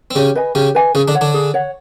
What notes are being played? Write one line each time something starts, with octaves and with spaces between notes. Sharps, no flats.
C4
C#3 C#4 G4
B4 D#5 G#5
C#3 C#4 G4
B4 D#5 G#5
C#3 C#4 G#4
D3 D4
C#5 F#5
D3 D4
G#4
C#5 F#5